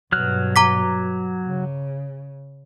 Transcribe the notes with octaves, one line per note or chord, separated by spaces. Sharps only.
G2 B2 F#3 F6 F#6
A#5 D6 B6
C#3